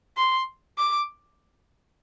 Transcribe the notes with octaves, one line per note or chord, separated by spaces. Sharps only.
C6
D6